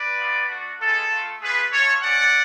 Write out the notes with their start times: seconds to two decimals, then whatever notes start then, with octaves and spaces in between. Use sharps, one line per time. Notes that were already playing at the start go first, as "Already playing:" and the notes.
Already playing: B4 D5
0.17 B3 F4
0.48 A3 D4 F#4
0.79 G#3 B3 F4 A4
1.10 A3 F4
1.40 A3 F4 G#4 B4
1.71 A3 F4 A4 C#5
2.02 A3 C#4 F#4 D5 F#5